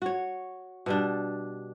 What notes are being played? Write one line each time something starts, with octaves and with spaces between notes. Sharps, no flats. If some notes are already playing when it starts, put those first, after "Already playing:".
F#4 C#5
B2 G3 D4